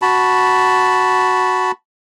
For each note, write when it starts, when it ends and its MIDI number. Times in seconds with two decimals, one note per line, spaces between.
0.02 1.72 66
0.02 1.72 81
0.02 1.72 83